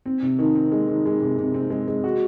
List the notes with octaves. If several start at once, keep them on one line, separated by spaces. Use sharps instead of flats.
C4
C3
D#3
C4
G#3
D#3
G#3
C3
C3
C4
G#3
G#3
F#4